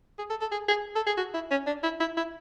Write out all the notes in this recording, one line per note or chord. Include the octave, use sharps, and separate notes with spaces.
G#4
A4
A4
G#4
G#4
A4
G#4
F#4
E4
C#4
D4
E4
E4
E4